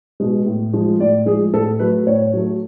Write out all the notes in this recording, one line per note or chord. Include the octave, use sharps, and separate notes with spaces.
B2 G#3
A2
F3 G#3
A2 D5
F3 G#3 G#4
A2 A4
F#3 A3 B4
A2 C#5
F#3 A3